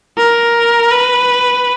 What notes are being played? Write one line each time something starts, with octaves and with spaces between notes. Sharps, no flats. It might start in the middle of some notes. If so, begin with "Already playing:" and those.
A#4
B4